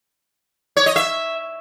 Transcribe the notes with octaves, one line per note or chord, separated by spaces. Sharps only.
C#5
D#5
E5